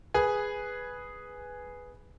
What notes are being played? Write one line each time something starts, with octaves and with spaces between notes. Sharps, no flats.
G#4 B4 G#5